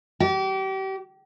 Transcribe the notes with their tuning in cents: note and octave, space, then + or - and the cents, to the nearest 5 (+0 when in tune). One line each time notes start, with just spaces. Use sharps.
G4 -35